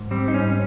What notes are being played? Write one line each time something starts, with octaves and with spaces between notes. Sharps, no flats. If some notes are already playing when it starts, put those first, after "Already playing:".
Already playing: G#2
G3 C4
D#4
G#2 C#4